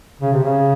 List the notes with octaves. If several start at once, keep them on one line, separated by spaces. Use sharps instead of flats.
C#3
C3
C#3